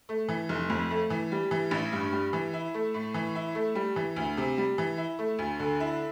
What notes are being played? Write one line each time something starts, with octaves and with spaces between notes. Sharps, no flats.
A3
E3
F1
F2
A3
E3
G3
E3
A1
G2
G3
E3
E4
A3
A2
E3
E4
A3
G3
E3
D2
C3
G3
E3
E4
A3
D2
D3
E4